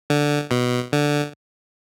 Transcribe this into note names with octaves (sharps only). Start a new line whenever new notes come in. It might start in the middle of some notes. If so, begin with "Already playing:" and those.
D3
B2
D3